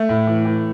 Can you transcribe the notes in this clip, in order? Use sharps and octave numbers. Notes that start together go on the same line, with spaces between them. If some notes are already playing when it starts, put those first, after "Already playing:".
Already playing: A3
A2
E3
E3